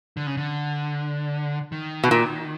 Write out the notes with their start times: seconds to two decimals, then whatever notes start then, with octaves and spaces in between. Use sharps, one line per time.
0.17 D3
0.27 C#3
0.37 D3
1.72 D#3
2.04 B2
2.11 A#2